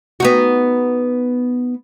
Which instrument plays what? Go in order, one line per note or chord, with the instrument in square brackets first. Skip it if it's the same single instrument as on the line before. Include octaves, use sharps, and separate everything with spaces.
[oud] B3 D#4 F#4